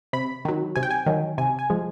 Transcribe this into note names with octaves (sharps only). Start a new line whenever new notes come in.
C3 B5
D#3 F#3
C3 G#5
G5
G#5
D#3 F#3
C3 G#5
G#5
F3 G#3